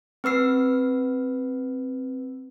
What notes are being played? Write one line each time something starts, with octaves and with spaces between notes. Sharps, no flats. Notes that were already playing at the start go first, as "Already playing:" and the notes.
C4 B4 E6 C7